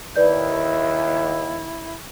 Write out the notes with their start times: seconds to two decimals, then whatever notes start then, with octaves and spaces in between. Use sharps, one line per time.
0.16 D#2 E4 B4 D5 G6